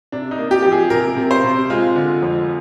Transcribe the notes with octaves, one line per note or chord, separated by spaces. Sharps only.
C3 D4
D#4
A#3
G4
F3 G4
G#4
C3 A#4
C3
C5
C3
G#3 F4
D3
F2